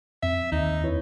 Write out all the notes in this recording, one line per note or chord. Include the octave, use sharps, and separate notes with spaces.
F2 C4 E5
D#2 D#4
E4 B4 C#5